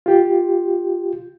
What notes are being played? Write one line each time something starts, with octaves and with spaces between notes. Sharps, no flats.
F4 G4